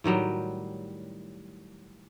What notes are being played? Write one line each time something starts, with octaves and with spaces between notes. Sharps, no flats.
A2 D#3 F#3 G3